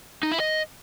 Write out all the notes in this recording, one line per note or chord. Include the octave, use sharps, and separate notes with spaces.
D#4
E4
D#5